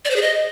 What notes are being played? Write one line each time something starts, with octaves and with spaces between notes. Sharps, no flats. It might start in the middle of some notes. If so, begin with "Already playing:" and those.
D5
C5
G#4
D#5